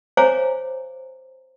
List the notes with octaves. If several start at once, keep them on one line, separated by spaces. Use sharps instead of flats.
C5 C#5 F5 G#5 A#5 D6